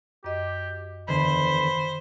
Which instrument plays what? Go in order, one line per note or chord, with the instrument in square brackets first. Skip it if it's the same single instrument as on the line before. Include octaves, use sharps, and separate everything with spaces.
[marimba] F#2 D#5 [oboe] G4
[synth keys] E2 D3 [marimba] D#3 [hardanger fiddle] C5 [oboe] B5